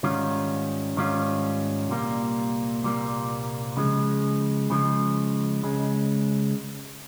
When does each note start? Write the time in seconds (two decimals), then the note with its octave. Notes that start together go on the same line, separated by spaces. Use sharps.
0.03 G#2 D#3 G3 C#4 F4
0.97 G#2 D#3 G3 C#4 F4
1.90 C2 A#2 G3 A#3
2.83 C2 A#2 G3 A#3
3.77 C#3 F3 G#3
4.70 C#3 F3 G#3
5.63 C#2 C#3 G#3